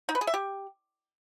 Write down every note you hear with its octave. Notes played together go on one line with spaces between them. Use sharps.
D#4
B4
G#4
E5
G4